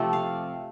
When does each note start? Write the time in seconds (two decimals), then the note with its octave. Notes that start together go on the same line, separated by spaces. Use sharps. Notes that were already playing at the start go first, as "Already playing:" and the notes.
Already playing: C3 F3 A3 C4 G4 A4
0.13 F5